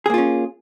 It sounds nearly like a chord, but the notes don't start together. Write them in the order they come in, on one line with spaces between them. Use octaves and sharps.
G#4 A#3 F4 C#4